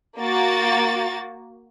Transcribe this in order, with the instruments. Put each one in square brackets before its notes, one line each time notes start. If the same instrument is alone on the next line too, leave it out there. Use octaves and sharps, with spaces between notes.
[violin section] A#3 F#4 A6